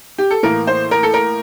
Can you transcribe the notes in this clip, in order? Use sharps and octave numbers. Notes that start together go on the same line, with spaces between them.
G4
A4
A2 E3 A#3 A#4
C5
A#4
A4
A#4